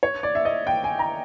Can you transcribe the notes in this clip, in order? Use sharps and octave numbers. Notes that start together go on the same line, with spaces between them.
C#5
D5
E5
D#5
G5
G#5
A#5